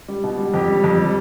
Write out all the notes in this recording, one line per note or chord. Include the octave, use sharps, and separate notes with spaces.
G3
B2
G3
F2 G4
G3
F2
G3